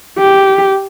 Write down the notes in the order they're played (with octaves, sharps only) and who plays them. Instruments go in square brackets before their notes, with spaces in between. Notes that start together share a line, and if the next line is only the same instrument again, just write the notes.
[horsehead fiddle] G4